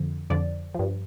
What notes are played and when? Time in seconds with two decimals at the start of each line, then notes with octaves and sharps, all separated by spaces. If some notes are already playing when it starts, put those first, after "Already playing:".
Already playing: F2 D3 F3
0.30 F2 D3 F3 D5
0.75 G2 F3